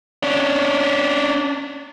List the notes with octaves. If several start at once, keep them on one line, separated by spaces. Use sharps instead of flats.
C#4 D4